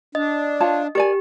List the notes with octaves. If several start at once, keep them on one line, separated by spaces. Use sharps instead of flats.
D4 D#5
F4 C#5 A5
G4 A#4 D5 G#5